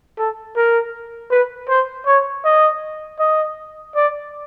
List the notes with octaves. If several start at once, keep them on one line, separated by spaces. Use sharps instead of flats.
A4
A#4
B4
C5
C#5
D#5
D#5
D5